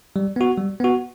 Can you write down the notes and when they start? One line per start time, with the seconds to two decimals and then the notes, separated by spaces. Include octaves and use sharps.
0.16 G3
0.36 B3 F#4
0.58 G3
0.80 B3 F#4